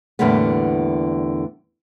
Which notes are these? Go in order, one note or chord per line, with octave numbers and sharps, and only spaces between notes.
E2 A2 D3 G3 A#3 B3